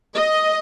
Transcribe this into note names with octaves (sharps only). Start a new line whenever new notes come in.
D#5